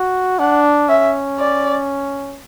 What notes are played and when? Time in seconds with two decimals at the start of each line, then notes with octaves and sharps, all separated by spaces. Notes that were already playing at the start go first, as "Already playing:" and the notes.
Already playing: F#4
0.39 D4 F#5
0.89 C#4 E5
1.39 D5